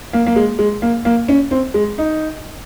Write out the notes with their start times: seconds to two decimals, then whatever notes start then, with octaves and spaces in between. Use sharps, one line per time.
0.13 A#3
0.27 A#3
0.36 G#3
0.59 G#3
0.82 A#3
1.05 A#3
1.28 C#4
1.51 C4
1.74 G#3
1.98 D#4